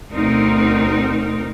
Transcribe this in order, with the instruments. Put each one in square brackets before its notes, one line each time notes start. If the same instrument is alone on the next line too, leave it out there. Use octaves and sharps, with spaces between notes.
[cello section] D2 B2 C4 D#4 A#4